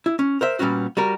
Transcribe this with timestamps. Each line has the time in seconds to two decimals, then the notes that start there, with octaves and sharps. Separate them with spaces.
0.06 E4
0.19 C#4
0.41 A#4 C5 E5
0.59 A#2 G3 B3 C#4 F#4
0.97 G3 F#4 A#4